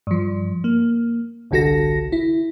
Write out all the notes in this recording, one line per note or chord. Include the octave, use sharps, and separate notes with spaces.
G2 F3
A#3
G1 C2 D3 F#4 A4 A#6
E4